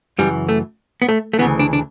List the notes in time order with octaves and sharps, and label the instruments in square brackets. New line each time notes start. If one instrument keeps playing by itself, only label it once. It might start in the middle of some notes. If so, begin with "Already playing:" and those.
[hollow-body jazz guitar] F#2 C#3 E3 G3
A3
B3
A3
A3
D2 C#3 E3 B3
D4
D4